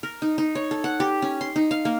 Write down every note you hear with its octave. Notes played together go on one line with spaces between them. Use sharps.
A#4
D#4
D#4
C#5
A4
F#5
G4
C#4
C6
D#4
F5
A#3